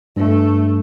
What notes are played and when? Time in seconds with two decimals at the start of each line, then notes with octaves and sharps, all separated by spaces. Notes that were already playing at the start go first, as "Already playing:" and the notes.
0.17 G2 A3